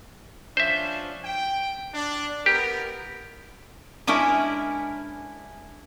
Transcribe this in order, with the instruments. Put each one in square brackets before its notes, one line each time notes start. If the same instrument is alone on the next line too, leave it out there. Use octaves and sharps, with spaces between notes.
[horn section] F3 C#4 D4 [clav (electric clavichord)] C5 E5
[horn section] G5
D4
[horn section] B3 A#4 [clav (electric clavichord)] G4
[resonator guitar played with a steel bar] G#3 C#4 D4 E4 A#4 E5